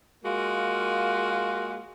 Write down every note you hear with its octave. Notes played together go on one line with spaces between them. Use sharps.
G#3 A#3 F4 F#4